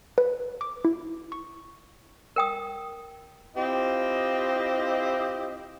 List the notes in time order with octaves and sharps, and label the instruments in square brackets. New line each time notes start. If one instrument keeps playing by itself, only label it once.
[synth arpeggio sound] B4
D6
E4
C#6
[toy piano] A#4 G5 D#6
[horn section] C4 E4 F4 G4 D#5